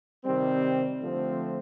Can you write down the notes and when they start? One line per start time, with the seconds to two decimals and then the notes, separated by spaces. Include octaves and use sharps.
0.25 C3 D#3 G3 C4
1.00 D3 F3 A3 C4